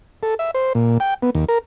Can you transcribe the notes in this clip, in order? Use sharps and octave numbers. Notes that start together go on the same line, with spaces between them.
A4
E5
C5
A#2
G5
B3
D#2
A#4